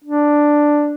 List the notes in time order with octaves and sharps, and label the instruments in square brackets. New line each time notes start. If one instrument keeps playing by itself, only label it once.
[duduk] D4